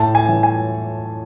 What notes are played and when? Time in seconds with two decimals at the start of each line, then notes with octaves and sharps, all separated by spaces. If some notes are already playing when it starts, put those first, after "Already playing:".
Already playing: A2 A5
0.15 G#5
0.29 E3
0.43 G#5